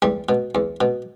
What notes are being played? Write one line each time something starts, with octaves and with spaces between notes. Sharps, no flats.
E2 G3
B2
E2
B2